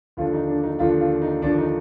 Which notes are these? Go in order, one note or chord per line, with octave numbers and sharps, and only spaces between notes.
D#2 D3 F3 F4
D#4
D4
D#4
D#2 D3 F3 F4
F4
D#4
D#2 D3 F3 D4
D#4